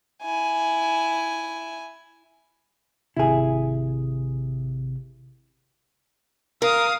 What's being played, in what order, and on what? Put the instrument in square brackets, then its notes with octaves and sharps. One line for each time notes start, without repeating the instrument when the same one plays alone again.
[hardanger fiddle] E4 G#5
[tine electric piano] G#1 C3 [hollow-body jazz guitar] E4 G#4
[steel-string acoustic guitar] A#4 [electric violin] F5 D#6